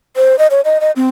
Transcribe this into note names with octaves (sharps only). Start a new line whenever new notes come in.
C5
D#5
C#5
D#5
D#5
C4